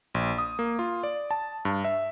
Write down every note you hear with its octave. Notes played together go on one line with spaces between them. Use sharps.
A#1
D#6
A#3
F4
D5
A5
G2
E5